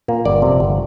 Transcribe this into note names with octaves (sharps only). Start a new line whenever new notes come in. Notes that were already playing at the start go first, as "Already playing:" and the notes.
A#2 A#3
G1 D5
F2 C3
G1